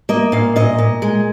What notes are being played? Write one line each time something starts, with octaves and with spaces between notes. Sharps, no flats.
A#3 D#5
A#2 F5
A#2 D#5
A#2
G#3